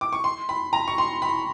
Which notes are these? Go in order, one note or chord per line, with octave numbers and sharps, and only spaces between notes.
D6
C#6
C6
B5
A#5
C#6
C6
B5